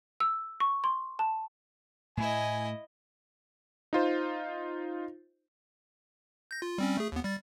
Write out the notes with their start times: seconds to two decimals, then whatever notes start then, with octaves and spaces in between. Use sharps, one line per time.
0.20 E6
0.60 C#6
0.84 C6
1.19 A5
2.17 A2 A3 E4 D#5 G#5
3.93 D#4 F4 C5
6.51 G6 A#6
6.62 F4
6.78 G3 C4 C#4
6.97 A3 G#4
7.12 D#2 B3
7.24 G3 A6